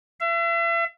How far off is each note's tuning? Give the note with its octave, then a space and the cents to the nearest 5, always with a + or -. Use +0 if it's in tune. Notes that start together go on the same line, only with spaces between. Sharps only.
E5 +40